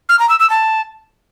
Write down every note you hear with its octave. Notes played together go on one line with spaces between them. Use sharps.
F6
A#5
E6
E6
A5